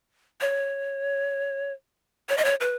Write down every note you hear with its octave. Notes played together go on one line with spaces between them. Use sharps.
C#5
C#5
D#5
C#5
B4